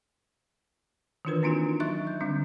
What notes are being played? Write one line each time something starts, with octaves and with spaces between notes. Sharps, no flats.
D#3 E3 D4 F4 A#4 B4
A#3 C4 D4 D#4 F4 F#4
F#3 D#4 E5 C#6 F#6 A6
G6
D3 G3 C4 D4